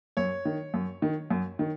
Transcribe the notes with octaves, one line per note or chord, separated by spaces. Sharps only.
F#2 C#5
D#3
F#2
D#3
F#2
D#3